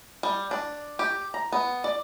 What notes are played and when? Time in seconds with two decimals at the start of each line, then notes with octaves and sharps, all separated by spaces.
0.23 G3
0.51 D4
0.99 G4
1.34 A#5
1.52 B3
1.84 D5